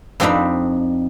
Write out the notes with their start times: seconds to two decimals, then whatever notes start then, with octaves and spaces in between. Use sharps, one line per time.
0.20 F2 C4 D4 D#4 B5